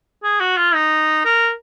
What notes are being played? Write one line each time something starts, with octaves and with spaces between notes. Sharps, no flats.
G#4
F#4
F4
D#4
A#4